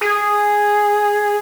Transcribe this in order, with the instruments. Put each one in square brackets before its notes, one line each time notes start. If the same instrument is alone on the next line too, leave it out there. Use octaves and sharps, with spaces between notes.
[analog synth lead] G#4